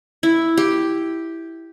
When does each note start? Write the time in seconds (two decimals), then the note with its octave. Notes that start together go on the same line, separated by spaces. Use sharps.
0.23 E4
0.57 G4